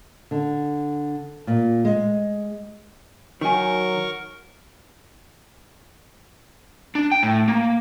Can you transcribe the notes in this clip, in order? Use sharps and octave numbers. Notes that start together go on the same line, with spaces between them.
D3
A#2
G#3
D#3 F#3 A#4 G#5 B5 C#6
D4
G5
A2
A#3